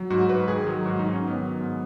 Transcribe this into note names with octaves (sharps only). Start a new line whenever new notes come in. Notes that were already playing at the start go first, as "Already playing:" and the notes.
Already playing: F#3
G#2 F#4
G#2 B4
D#3 G#4
F#3 G#4
G#2 F#4
G#2 D#4
C#4
D#3
B3
F#3
G#2